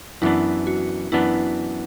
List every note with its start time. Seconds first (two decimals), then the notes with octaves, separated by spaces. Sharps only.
0.22 F#2 E3 B3 D4 E4
0.67 F#4
1.12 F#2 E3 B3 D4 E4